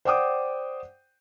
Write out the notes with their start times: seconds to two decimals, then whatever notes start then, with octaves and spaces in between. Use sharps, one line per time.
0.05 C5 D5 F#5 G5 D6 D#6